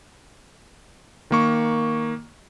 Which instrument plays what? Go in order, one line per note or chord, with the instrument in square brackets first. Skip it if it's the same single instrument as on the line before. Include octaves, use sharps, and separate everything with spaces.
[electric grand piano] D#3 A#3 C#6